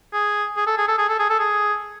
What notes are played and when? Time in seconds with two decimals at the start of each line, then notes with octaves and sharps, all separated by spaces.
0.13 G#4
0.57 G#4
0.67 A4
0.78 G#4
0.88 A4
0.98 G#4
1.09 A4
1.20 G#4
1.30 A4
1.40 G#4